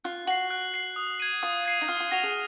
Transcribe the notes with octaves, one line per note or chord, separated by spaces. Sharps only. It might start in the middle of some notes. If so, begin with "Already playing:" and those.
F4 F#6
F#4 C7 F#7
F#6
C7 F#7
D#6
G#6 C7 D#7
F4 D#6
G#6 C7 D#7
D#4
F4 F6
F4
F#4 A#6 F7
G#4